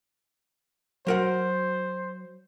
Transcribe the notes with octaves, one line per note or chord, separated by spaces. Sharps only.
F#3 A#4 C5 F#5